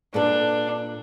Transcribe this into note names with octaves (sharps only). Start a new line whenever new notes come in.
A#2 D4 A4 B4